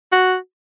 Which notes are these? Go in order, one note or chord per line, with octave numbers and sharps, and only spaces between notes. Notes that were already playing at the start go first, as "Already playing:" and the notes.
F#4